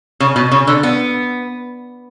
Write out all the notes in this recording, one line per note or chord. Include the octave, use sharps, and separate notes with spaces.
C#3
B2
C#3
D3
B3